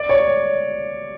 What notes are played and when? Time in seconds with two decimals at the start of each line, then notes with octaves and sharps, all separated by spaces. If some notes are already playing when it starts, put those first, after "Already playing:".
Already playing: D5
0.09 C#5